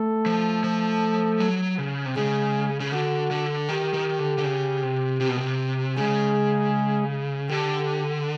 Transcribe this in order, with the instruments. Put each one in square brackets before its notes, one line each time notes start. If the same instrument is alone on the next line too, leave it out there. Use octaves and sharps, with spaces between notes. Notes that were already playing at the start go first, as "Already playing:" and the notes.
Already playing: [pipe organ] A3 A4
[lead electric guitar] F3
F3
F#3
C#3
C3
[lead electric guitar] C#3 [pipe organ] G#3 G#4
[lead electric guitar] C#3
[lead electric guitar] D3 [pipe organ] F#4
[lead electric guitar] D3
[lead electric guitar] D#3 [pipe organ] G4
[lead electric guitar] D#3
D3
D3
C#3
C3
C3
B2
C3
[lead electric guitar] C#3 [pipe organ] G#3 G#4
[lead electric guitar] D3 [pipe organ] G4